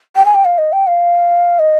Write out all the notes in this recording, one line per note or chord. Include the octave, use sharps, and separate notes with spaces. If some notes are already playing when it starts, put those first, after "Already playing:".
G5
G#5
G5
F5
D#5
G5
F5
D#5